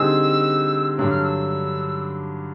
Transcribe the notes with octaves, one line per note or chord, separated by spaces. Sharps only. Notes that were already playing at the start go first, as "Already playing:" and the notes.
Already playing: D3 G3 C4 D#4 G#4 E6
G2 D3 F#3 E6
F6
E6